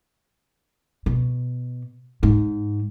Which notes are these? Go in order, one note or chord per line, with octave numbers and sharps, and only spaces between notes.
B2
G#2